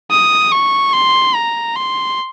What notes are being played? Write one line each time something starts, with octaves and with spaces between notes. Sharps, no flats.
D#6
C#6
C6
A#5
C6